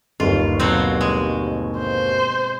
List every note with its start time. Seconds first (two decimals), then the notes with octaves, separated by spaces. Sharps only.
0.20 G1 D#2 F4
0.60 B2 F#3 C4
1.01 G#3
1.79 C5